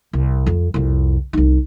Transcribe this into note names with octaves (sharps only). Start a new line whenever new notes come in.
C2
F2
C2 F2
C2 D#4